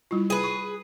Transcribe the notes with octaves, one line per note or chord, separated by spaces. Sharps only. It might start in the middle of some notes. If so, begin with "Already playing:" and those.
G3 E4 F4
G#4 B4
C#6